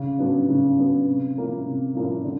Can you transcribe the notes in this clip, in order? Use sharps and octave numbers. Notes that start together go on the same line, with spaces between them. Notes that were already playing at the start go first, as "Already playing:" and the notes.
Already playing: C#3
F#3 B3 D4
C#3
F#3 B3 D4
C3
F3 A#3 C#4 E4
C3
F3 A#3 C#4 E4
D3